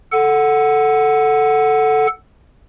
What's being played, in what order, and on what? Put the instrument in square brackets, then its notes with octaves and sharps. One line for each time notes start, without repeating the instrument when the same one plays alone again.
[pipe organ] A4 F#5